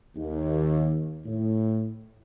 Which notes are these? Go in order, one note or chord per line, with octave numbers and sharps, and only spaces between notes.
D#2
A2